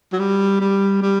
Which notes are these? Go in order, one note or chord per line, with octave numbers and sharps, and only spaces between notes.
F#3
G3
G3
G3